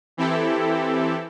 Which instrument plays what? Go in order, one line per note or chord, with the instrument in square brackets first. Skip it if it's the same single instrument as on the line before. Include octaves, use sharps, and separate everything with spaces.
[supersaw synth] E3 C4 E4 G4 A4